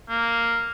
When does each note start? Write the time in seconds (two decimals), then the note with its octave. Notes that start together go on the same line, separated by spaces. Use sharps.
0.09 A#3